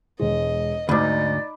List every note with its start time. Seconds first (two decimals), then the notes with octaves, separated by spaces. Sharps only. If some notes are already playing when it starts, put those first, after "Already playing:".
0.19 E1 G#3 D#5
0.89 D2 G#2 D#4 D5 B5 D6